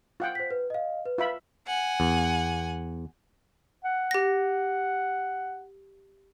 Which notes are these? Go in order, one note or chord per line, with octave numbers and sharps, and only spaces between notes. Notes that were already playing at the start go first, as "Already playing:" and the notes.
F4 F#5 G5
C5 B6
B4
D#5 F5
B4
F4 E5 B5
F#5 G#5
E2
F#5
G4 A#6